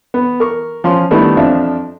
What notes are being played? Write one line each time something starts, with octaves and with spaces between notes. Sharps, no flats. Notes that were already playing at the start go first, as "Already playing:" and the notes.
B3
A#4 C#6
F3 C#4 C6
D#3 G3 A3 B3 D4 E4
F2 F3 D4 E5